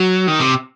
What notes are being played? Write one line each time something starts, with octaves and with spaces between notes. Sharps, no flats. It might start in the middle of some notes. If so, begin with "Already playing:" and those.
Already playing: F#3
D#3
C3